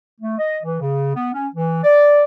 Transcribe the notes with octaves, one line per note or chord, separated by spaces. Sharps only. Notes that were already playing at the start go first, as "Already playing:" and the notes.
A3
D#5
E3
C#3
B3
C#4
E3
D5